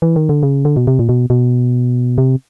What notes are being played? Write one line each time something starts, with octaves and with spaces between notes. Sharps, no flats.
E3
D#3
D3
C#3
D3
B2
C3
A#2
B2
B2
C3